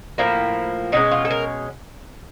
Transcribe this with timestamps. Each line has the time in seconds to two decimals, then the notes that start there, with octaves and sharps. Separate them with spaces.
0.18 A2 F3 A#3 E4
0.92 B2 G#3 C#4 D#4
1.11 F4
1.25 A4
1.31 A#4